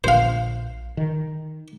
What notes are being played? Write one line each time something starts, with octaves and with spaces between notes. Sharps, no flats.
A#1 C5 F5
D#3